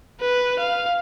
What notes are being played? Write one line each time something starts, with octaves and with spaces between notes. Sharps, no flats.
B4
F5